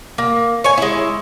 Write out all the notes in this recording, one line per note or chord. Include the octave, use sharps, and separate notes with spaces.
A#3
C#5 G#5
G#3 E4